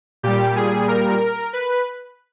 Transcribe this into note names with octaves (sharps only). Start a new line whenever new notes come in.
A#2 G3 G4
G#4
A#4
B4